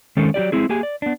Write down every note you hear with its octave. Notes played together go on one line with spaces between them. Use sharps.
D#3 G#3 C4 C#4 A4
F#3 E4 G4 D5
G#3 C4 E4 G#4
A#3 G4 G#4 G#5
D5
B3 D4